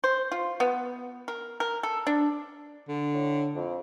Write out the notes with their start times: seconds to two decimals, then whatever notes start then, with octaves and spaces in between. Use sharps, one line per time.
0.04 C5
0.32 F4
0.60 B3
1.28 A#4
1.60 A#4
1.83 A4
2.07 D4
2.88 D3
3.14 A2
3.55 F2